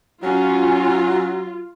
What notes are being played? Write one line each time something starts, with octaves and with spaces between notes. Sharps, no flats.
F#3 C#4 F4